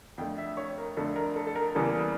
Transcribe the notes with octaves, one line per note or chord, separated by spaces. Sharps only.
F2 D3 A3 G5
E5
C#5
A#4
F2 D3 A3 A4
A#4
A4
A4
A#4
E2 C#3 E3 G3 A#3 A4